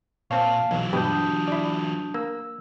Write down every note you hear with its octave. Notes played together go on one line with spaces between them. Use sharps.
A#2 C4 C#5 F5 A5
B1 E3 F#3
G2 B2 D4 G4 D#6 G6
E4 D5
A#3 E6